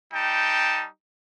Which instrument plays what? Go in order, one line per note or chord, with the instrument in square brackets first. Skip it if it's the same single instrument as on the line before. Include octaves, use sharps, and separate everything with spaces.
[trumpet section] G3 D#4 G5 A5